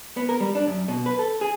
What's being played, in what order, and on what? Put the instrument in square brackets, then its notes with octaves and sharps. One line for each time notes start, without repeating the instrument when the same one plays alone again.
[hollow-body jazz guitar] B3
A#4
G3
D4
F#2
B2
B4
A4
G#4